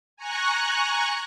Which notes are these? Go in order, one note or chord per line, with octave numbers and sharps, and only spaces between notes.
G#5 A#5 C#6 F#6